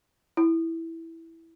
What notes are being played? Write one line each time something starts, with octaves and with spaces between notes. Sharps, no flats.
E4